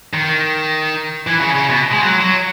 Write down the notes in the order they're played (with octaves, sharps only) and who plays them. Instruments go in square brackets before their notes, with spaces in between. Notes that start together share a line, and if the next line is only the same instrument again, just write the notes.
[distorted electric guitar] D#3
E3
C#3
C#3
B2
G#3
F#3
F#3